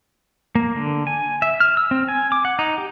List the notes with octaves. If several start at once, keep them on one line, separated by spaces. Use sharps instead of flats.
A#3
D3
G#5
E5
F6
E6
C4
G#5
D6
F#5
D#4
G4